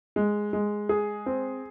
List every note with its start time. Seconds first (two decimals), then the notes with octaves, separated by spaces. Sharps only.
0.16 G#3
0.53 G#3
0.89 G#4
1.26 C4